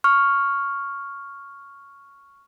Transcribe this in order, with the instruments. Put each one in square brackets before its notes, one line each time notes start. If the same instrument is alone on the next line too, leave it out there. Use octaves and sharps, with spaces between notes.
[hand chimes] C#6 F6